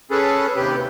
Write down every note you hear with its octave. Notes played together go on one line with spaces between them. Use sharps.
C#4 G#4 A4 B4
D#2 C3 G4 B4